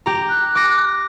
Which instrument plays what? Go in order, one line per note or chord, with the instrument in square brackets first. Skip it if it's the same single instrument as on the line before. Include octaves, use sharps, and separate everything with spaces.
[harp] G4 A#5
[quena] F#6
[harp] D6 A#6